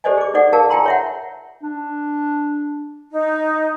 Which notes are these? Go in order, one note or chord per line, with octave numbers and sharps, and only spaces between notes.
G4 A4 C5 D5 D#5 G#5
G#4 D6
D#4 A4 D5 F#5
G#4 A#4 F5 A5
F4 G#4 G5 G#5 A#5 C6
C#5 E5 F#5
D4
D#4